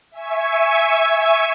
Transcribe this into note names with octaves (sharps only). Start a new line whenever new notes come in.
E5 G#5 C#6